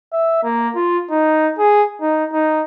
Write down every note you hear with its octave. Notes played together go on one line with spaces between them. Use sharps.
E5
A#3
F4
D#4
G#4
D#4
D#4